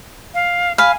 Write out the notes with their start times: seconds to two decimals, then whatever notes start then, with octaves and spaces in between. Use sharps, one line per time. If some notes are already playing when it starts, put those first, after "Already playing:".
0.34 F5
0.78 F5 G#5 B5